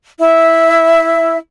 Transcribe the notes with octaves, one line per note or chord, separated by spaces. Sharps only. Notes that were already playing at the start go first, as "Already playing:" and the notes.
E4 E5